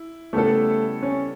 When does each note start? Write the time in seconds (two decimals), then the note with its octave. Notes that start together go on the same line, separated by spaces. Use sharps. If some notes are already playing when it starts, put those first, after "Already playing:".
Already playing: E4
0.33 C#3 G3 A3 B3 E4 A4
1.03 C#4